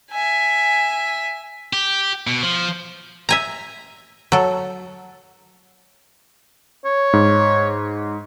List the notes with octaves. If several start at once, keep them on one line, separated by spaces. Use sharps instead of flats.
E5 G#5
G4
B2
F3
E5 G#5 A#5
F#3 A4
C#5
G#2